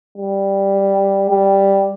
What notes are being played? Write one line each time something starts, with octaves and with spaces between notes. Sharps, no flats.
G3
G3